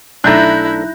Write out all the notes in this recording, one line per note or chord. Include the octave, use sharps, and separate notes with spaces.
B1 A3 D4 E4 A#5 F#6 G6 A#6